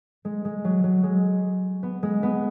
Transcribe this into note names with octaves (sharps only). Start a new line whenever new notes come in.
G#3
G#3
F#3
F#3
G#3
B3
G#3
B3